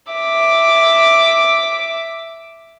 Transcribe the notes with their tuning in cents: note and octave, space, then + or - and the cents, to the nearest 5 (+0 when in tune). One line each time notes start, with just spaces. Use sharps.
E5 +0 D6 +0